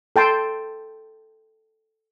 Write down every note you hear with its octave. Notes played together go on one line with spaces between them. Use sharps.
A4 G5 A5 C6